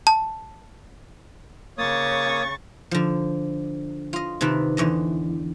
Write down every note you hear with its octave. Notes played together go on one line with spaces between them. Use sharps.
A5
C#3 A#3 C#5 C#6 D#6 A6
D3 F3
F4 D#5
C3 D#3 B4 A5
E2 D3 D#5